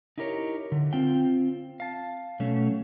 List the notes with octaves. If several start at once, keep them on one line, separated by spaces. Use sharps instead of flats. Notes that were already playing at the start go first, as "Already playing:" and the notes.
D#4 E4 G4 A#4 B4 C#5
D3
C4 F4 G5
F5 A5
B2 F#3 A3 C#4